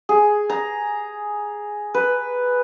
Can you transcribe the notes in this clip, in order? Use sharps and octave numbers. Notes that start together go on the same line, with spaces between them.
G#4
A#5
B4